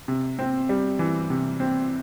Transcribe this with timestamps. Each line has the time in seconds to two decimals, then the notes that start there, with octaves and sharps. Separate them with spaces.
0.08 C3
0.39 C4
0.69 G3
0.99 E3
1.30 C3
1.60 C4